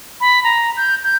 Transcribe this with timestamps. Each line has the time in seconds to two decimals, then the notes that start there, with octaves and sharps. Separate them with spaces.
0.21 B5
0.44 A#5
0.77 G6
1.03 G6